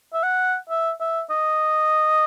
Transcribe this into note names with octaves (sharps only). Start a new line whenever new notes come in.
E5
F#5
E5
E5
D#5